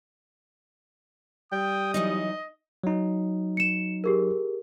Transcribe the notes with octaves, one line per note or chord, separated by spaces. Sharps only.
G3 G5 D#6
E3 F#3 D#4 D#5
F#3 D#4
C#7 E7
G4 G#4 A#4